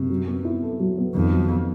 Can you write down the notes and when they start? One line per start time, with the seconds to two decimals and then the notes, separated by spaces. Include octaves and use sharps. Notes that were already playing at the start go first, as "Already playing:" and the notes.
Already playing: F#2 C3
0.10 F#3
0.27 B3
0.45 E4
0.62 A4
0.80 F#3
0.98 B3
1.15 F2 D#3
1.32 F#3
1.50 B3